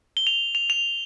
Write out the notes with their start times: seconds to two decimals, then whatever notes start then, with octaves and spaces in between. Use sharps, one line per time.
0.17 G7
0.27 F7
0.55 F7
0.70 F7